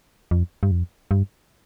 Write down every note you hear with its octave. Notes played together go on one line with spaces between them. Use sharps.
F2
G2
F2
G2